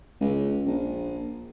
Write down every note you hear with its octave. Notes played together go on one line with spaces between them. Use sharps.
C#2
A#1